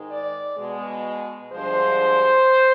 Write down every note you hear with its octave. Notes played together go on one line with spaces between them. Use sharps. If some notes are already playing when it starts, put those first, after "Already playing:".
Already playing: G#2 D#3 G#3
D5
B2 G#3
G2 D3 F3 G#3 C5